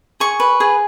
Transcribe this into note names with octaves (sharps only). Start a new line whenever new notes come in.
G#4 C#6
B4
G#4